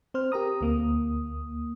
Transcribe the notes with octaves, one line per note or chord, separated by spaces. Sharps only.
C4 C5 F6
G4 A#4 A#5 D#6
D2 A#3 D#6